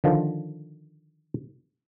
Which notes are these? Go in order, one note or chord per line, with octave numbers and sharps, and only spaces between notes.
D3 D#3 F3